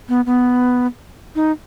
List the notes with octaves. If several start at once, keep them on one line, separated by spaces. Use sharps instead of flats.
B3
B3
D#4